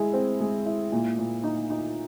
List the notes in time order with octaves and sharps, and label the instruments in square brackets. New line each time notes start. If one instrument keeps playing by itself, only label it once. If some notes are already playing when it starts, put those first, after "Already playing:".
Already playing: [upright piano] G#3 E4
C4
G#3
E4
A#2
A#2
D#4
D#4